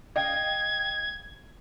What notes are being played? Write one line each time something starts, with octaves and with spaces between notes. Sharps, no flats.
D#5 F5 G5 G#6